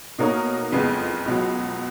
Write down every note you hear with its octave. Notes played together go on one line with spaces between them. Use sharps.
B2 A#3 D#4 A#4 C#5
F#1 F2 C#3 G#3 B3
C#2 B2 F#3